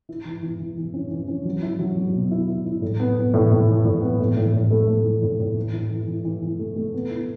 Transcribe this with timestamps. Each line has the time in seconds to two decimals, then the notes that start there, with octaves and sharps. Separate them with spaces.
0.09 E4
0.25 E3
0.43 E3
0.59 E3
0.77 E3
0.94 C#4
1.11 E3
1.28 C#4
1.45 F#3
1.63 E4
1.79 F#3
1.97 F#3
2.14 B2
2.31 E4
2.48 E4
2.66 E4
2.82 A2
3.00 B3
3.17 B3
3.34 A2
3.51 A2
3.68 E3
3.85 A2
4.02 B3
4.20 A2
4.36 A2
4.53 A2
4.70 A3
4.87 A3
5.04 E3
5.22 A2
5.39 A2
5.57 E3
5.73 E4
5.90 E3
6.07 E3
6.25 E3
6.42 E3
6.59 A3
6.76 A3
6.94 B3
7.11 E4